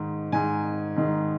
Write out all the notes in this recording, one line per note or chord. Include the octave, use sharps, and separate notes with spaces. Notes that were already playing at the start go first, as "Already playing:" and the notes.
Already playing: G#2 D#3
G#2 D#3 G#5
G#2 D#3